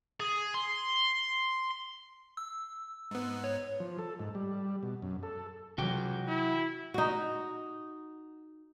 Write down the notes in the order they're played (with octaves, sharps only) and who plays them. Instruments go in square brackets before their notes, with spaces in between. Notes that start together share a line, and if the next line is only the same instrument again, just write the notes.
[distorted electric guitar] G#4
C6
[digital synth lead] E6
[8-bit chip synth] G#2 B3
[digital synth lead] C#5
[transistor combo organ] F3
A4
G#2
G3
B2
F#2
A4
[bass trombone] C#2 [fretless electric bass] C3 E3 F#3 [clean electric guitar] F#4 G5
[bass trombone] E4
[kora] D#4 F#4